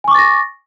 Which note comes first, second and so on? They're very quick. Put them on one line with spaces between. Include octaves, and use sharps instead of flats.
G#5 C#6 D6 A6 A#6